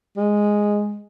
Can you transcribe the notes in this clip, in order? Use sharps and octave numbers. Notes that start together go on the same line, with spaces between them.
G#3